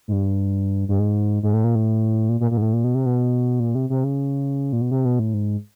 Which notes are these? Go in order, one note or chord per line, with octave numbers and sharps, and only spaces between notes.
G#2
G2
G2
G#2
G#2
A2
A#2
A2
A#2
A#2
A#2
G#2
A2
A#2
B2
C3
B2
A#2
C3
C3
C#3
A#2
B2
C3
B2
A2
G#2